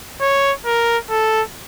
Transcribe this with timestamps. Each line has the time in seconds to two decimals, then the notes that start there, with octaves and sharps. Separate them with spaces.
0.22 C#5
0.66 A#4
1.11 A4